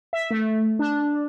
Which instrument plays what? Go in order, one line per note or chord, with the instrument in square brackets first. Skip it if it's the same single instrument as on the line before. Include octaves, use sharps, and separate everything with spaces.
[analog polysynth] E5
A3
D4